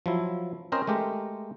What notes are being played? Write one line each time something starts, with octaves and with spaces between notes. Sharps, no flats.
F3 F#3 E4
C4 C#4 A#4 C5 D#5
G#3 A3 G4 A#4